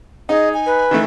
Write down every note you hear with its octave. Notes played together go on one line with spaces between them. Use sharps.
D#4 G#4 D#5
G#5
B4
D#3 E3 A3